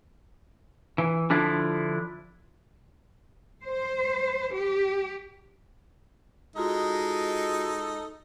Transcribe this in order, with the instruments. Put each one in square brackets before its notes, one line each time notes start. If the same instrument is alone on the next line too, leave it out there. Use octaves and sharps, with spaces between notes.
[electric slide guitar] E3
D3 F3 D4 E4
[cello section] C5
G4
[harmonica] G#3 D#4 A4 [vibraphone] F4 F#4 A#5